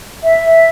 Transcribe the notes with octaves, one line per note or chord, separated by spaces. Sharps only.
E5